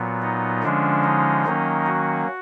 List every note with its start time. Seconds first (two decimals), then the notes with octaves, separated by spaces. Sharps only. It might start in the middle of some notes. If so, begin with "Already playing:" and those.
Already playing: A#2 F#3 B3
0.22 D#4
0.63 D3 F3 G#3 C#4 D4
1.04 D#4
1.45 D#3 F#3 A#3 C#4
1.86 F#4